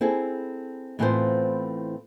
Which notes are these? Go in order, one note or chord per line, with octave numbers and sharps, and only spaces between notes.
C4 E4 G#4 A4
A2 E3 B3 C4 F4 C5